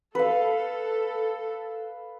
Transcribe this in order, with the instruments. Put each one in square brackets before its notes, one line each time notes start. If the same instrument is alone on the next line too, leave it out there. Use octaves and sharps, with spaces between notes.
[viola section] A4 [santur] B4 F5